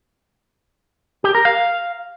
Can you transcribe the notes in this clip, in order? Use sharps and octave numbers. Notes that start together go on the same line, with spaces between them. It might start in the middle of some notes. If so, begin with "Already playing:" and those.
G4
A#4
F5